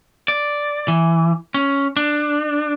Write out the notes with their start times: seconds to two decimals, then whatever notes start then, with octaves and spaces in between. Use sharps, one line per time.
0.28 D5
0.88 E3
1.54 C#4
1.97 D4